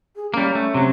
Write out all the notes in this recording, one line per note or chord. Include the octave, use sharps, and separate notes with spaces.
G#4
G3 A#3 C#4
A3
C3 F#3